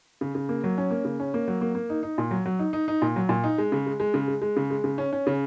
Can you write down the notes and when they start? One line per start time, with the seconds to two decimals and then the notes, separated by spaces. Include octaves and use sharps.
0.21 C#3
0.35 C#3
0.49 A#3
0.64 F#3
0.78 C#4
0.91 A#3
1.05 C#3
1.20 C#4
1.34 A#3
1.48 F#3
1.61 A#3
1.75 A#3
1.90 D#4
2.03 D#4
2.18 A#2
2.31 F#3
2.46 F#3
2.59 D#4
2.73 D#4
2.88 D#4
3.02 A#2
3.16 F#3
3.29 A#2
3.44 D#4
3.58 G#3
3.72 C#3
3.86 G#3
4.00 G#3
4.14 C#3
4.28 G#3
4.42 G#3
4.56 C#3
4.70 G#3
4.84 C#3
4.98 C#4
5.13 C#4
5.27 C#3